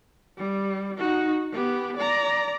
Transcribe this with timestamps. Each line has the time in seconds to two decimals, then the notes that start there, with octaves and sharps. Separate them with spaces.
0.38 G3
0.97 D#4 F#4
1.52 B3 G4
1.97 D5 A#5